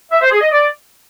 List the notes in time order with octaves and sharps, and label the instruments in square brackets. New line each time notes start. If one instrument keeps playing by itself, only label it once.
[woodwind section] E5
C5
G#4
D#5
D5